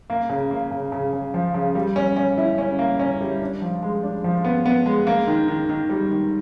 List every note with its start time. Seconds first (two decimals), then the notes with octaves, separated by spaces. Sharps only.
0.10 A#3
0.29 C#3
0.51 A#3
0.71 C#3
0.92 C#3
1.13 C#3
1.34 F3
1.54 C#3
1.75 G3
1.96 C#4
2.16 C#4
2.38 E4
2.58 C#4
2.79 A#3
2.99 C#4
3.21 G3
3.41 D4
3.62 F3
3.83 G#3
4.03 D4
4.24 F3
4.45 B3
4.66 B3
4.86 G#3
5.07 A#3
5.28 D#3
5.48 D#3
5.69 D#3
5.89 G3
6.11 D#3